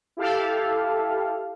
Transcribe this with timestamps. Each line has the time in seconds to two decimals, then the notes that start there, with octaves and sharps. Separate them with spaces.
0.17 E4 G4 A4 F5